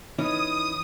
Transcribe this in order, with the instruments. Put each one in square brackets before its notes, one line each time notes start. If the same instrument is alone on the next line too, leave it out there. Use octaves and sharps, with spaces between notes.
[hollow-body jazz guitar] E3 C#4 D#4 [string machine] D#6